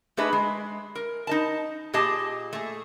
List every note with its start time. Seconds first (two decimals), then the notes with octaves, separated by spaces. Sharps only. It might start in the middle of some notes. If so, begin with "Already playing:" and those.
0.17 A3 D4 D#4 G#4 B4 D#5
0.33 G#3
0.95 A#4
1.27 D#4 D#5 A5
1.94 A#2 G4 G#4 D#5 A5
2.53 A3 G#4